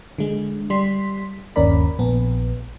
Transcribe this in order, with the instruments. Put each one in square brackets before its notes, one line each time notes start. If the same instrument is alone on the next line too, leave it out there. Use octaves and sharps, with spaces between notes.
[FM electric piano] D3 G#3
G3 C6 B6
G1 D#2 C#4 A#4 D5 B5
A#1 B3